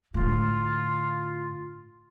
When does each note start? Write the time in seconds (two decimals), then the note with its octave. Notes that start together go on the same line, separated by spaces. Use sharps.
0.14 A2 D3 F4